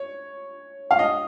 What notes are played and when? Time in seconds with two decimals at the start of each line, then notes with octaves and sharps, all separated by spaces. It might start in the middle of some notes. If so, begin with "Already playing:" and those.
Already playing: C#5
0.91 F5
0.99 D#5